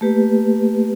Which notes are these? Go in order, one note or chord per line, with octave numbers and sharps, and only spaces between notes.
A3 A#3 G4 B4